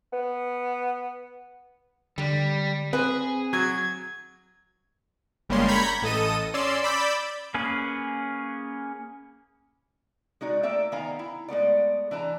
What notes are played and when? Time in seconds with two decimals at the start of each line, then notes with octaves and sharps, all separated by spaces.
0.13 B3
2.18 D3 G3
2.93 C4 G#4 B4
3.53 F#3 G#6
5.49 G1 G3 G#3 A#3 C#4 C6
5.68 A#5 B5 C#6 G6 G#6 B6
6.02 A1 A4 D#5 D#7
6.54 C#4 D5 C6 E6
6.83 D5 B5 D6 E6 G6
7.54 A#3 C#4 G#4 B4
10.41 G#3 D#4 F#4 D5
10.63 A3 A#3 A4 D5 E5 G5
10.92 D#3 B3 F5 G#5 A#5
11.19 E4
11.48 G#3 A3 B3 D5
12.11 E3 D4 B4 A5 A#5